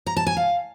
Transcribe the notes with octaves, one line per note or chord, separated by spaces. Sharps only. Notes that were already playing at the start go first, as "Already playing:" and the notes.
A#5
A5
G#5
F5